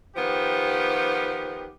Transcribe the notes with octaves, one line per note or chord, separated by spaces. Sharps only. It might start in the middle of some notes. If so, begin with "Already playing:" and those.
D#3 F3 B3 G4